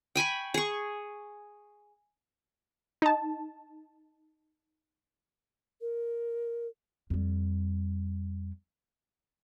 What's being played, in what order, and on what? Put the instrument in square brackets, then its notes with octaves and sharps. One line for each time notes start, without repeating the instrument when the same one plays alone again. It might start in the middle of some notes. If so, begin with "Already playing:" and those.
[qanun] G5 G#5 B5 C#6
G#4 C#6
[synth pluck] D#4 A5
[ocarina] A#4
[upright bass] F2 G3